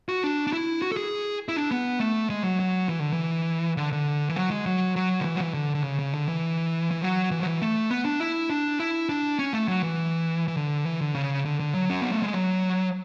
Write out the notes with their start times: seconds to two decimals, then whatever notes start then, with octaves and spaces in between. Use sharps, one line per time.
0.09 F#4
0.24 D4
0.47 D4
0.53 E4
0.82 F#4
0.92 A4
0.97 G#4
1.49 E4
1.56 D4
1.71 B3
2.00 A3
2.30 G#3
2.44 F#3
2.60 F#3
2.89 E3
3.00 D3
3.13 E3
3.77 D3
3.92 D3
4.29 E3
4.36 F#3
4.51 G#3
4.66 F#3
4.96 F#3
5.21 D3
5.25 E3
5.36 F#3
5.40 E3
5.54 D3
5.75 D3
5.83 C#3
5.99 C#3
6.14 D3
6.28 E3
6.91 E3
7.02 F#3
7.31 E3
7.40 F#3
7.46 E3
7.62 A3
7.91 B3
8.05 D4
8.20 E4
8.50 D4
8.80 E4
9.09 D4
9.39 C#4
9.53 A3
9.68 F#3
9.82 E3
10.48 E3
10.57 D3
10.86 E3
11.01 D3
11.15 C#3
11.45 D3
11.60 D3
11.74 F#3
11.90 C#4
12.01 B3
12.12 A3
12.23 G#3
12.34 F#3